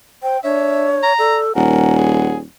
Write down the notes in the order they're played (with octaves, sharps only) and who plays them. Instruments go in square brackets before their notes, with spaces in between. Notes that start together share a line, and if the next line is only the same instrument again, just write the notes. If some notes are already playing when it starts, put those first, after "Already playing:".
[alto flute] C5 [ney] G5
[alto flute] D4 [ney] C#5 [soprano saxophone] E5
[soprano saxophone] A#5
[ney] A4 [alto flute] D5
[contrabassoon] D#1 [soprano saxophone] A#4 [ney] F#5 [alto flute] G#5
[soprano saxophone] G#4